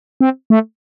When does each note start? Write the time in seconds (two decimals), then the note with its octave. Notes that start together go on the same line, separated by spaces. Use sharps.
0.21 C4
0.50 A3